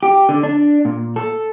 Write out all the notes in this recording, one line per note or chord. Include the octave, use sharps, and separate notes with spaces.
G4
D3
D4
A#2
A4